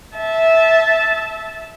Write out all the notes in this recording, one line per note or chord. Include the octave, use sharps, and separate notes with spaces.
E5 A5